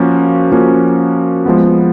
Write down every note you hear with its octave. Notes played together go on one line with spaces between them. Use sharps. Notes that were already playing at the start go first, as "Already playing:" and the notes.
Already playing: F3 A#3 C#4 F#4
F3 A#3 C#4 F#4
F3 G#3 B3